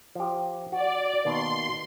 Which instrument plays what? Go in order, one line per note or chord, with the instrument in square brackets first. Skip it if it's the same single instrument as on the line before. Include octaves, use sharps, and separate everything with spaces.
[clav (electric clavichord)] F3 G4
[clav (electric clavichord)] F#4 [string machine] D5
[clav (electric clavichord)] B2 D#3 A#3 [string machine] C6